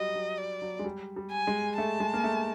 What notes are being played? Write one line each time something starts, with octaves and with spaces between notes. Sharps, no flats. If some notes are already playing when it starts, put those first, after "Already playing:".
Already playing: F#3 G3 D#5
F#3
D5
F#3
G#3
G3
G3
G#5
G#3
A3 A5
G#3
A#3
A3